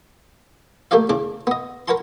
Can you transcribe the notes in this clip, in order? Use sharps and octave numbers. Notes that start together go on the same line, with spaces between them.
A3 A#3 G4 C#5 D5 F5
E2 C#3 D4 D6
B3 D#5
A#4 B4 C#5 F#5 A5 C6